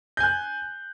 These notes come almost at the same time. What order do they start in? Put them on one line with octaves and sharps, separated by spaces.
G6 G#5 F#6